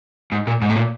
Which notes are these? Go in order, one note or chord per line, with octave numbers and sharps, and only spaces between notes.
G#2
A#2
G#2
A2
A#2